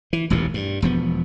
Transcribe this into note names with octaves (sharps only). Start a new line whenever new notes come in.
E3
E1 A1 D#2 A#2
G2
E1 F3 B3